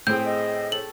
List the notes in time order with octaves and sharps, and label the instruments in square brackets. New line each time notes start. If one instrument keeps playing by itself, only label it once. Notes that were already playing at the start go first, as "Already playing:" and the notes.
[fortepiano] A2 C4 [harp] G#4 G5 [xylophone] G6
[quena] D#5
[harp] A4 C#5 [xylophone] F#7